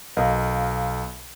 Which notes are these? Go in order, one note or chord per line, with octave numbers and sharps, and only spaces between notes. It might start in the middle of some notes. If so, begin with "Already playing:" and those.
B1 A#4 D#5 F5